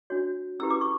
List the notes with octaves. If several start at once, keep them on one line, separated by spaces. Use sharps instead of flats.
D4 F#4 C#5
C#4 E4 G4 B4 E6
D6
C#6